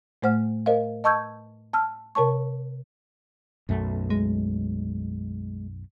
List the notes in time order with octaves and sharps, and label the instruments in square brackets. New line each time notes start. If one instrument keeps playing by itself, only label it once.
[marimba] A2 A3 C5 F#5 F6
A#4 C5 D#5 F5
D#5 A5 C#6 E6 G6 G#6
A5 E6 F6
C3 A#4 C#5 A5 C#6
[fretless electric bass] B1 F#2 A3
[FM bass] G#3